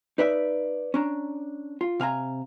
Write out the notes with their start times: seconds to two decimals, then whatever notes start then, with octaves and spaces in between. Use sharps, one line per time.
0.18 D#4 B4 D5 E5
0.94 C#4 D4 A#5
1.81 F4
2.00 C3 F5 G#5 A#5